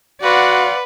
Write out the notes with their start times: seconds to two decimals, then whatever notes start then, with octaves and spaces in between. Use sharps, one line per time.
0.23 F#4 B4 D5 F5 F#5 C6